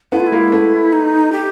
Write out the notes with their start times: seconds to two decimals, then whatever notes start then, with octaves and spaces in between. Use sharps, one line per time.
0.12 A3 B3 E4
0.20 F4
0.27 E4
0.32 G#3 A#3
0.52 A3 B3
0.93 D#4
1.32 G4